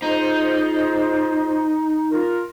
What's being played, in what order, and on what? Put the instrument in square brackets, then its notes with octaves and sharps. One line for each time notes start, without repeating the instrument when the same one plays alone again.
[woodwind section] G#3 F4 C5 [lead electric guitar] D#4
[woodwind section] F4 A#4